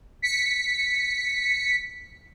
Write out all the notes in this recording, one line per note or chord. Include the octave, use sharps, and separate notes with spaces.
B6 C#7